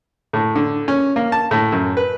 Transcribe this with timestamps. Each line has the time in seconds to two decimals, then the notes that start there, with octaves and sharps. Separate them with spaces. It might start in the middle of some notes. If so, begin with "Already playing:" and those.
0.33 A2
0.56 D3
0.88 C#4
1.16 A#3
1.32 A5
1.51 A2
1.72 F#2
1.97 B4